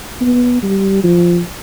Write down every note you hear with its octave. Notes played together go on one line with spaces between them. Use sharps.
B3
G3
F3